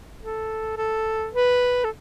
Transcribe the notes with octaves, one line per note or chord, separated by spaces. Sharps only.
A4
A4
B4
A4